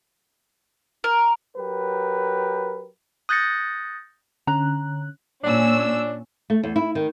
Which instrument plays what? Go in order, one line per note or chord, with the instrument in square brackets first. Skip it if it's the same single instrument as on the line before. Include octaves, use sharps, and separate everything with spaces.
[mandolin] A#4
[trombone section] F#3 G4 A#4 B4
[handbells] D#6 F#6 G6 A6 A#6 C#7
[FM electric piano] D3 C#4 F#6 [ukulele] A#5
[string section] A#2 C#4 E6 [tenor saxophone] D4
[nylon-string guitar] A3
E2
E4
D#3